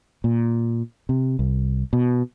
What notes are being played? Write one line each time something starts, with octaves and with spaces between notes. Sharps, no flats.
A#2
C3
C2
B2